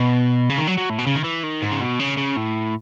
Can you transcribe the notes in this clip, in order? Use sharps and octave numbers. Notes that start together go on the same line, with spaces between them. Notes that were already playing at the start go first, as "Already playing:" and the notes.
Already playing: B2
C#3
D#3
F#3
F#3
A2
B2
C#3
D#3
E3
D#3
G#2
C#3
B2
C#3
C#3
A2